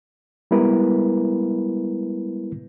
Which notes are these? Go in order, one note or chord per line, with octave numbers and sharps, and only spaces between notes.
G3 G#3 B3 E4 A#4 B4